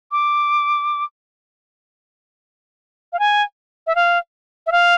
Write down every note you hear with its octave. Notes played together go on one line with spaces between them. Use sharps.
D6
F5
G#5
E5
F5
E5
F5